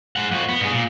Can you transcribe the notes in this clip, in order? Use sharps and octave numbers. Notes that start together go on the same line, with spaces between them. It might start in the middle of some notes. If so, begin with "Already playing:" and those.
G#3 F#5
F2 F#4
B3
G2 G#4
A#2